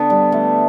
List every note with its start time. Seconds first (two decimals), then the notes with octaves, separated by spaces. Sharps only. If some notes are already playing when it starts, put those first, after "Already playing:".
Already playing: D3 B3
0.10 G3
0.32 A3